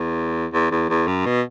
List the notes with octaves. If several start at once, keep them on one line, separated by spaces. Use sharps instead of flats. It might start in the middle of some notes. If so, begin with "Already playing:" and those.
Already playing: E2
E2
E2
E2
F#2
B2